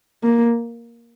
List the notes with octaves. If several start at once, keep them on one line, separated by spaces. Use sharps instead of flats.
A#3